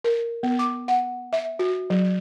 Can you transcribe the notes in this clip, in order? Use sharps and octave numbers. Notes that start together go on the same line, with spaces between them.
A#4
B3
D6
F#5
E5
F#4
F#3